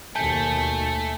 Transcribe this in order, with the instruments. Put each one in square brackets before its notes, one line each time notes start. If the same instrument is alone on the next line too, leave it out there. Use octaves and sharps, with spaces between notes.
[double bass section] D#2 B2 [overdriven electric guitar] A3 [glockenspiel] G#5 A5 G6